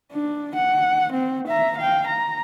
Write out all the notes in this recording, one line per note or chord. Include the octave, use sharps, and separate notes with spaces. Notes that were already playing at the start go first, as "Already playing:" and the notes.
D4
F#5
C4
E5 A#5
F5 G5
A#5